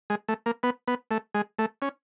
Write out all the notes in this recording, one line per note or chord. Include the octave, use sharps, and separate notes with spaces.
G#3
A3
A#3
B3
B3
A3
G#3
A3
C#4